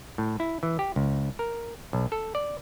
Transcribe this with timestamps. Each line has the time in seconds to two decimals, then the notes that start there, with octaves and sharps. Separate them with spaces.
0.18 A2
0.40 E4
0.63 E3
0.79 G4
0.96 C#2
1.39 A#4
1.93 B1
2.12 A4
2.35 D5